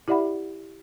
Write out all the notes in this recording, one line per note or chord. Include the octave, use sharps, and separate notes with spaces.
E4 G4 D5 E5 F#5 B5